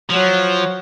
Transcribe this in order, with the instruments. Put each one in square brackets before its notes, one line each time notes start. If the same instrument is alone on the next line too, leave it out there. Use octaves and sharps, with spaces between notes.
[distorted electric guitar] F3 [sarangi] F#3